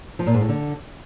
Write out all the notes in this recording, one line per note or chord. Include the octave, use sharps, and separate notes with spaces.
F3
A#2
G#2
A2
D3